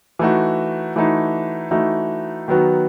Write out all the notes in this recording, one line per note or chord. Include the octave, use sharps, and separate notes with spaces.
E3 A3 D#4 F#4
E3 A3 D#4 F#4
E3 A3 D#4 F#4
D#3 F#3 B3 F#4